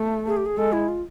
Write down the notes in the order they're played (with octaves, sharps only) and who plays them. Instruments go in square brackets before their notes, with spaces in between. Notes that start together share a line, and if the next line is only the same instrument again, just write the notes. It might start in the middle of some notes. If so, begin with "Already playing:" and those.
Already playing: [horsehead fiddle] A3
[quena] G#4
G4
G#4
[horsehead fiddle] G#3 [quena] A4
[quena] E4
F4